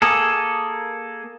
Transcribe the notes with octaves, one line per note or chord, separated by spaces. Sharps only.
A#3 G#4 A4